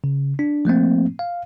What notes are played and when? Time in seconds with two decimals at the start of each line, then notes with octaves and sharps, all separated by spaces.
0.04 C#3
0.39 D4
0.65 F3 A3 A#3 C4
1.19 F5